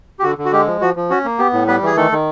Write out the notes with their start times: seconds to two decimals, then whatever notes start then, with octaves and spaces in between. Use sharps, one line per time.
0.19 G4
0.23 D3 F#4
0.38 D3
0.45 F#4
0.52 G#3 G4
0.67 F3
0.81 F3 F#4
0.96 F3
1.10 C#4 F#4
1.24 A#3
1.38 B3 G4
1.53 A2
1.67 G3 B3 B4
1.82 E3 G#4
1.97 D#3 A3 A4
2.12 D#3